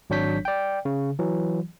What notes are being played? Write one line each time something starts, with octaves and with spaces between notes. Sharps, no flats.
G#1 F#3 D4 C#5 G6 B6
D5 G5
C#3
E3 F#3